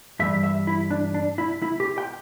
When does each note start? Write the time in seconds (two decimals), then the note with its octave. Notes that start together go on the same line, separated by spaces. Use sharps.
0.19 G2 E3 G3 E5
0.43 E5
0.67 E4
0.90 D4
1.14 D4
1.38 E4
1.62 E4
1.80 G4
1.98 G5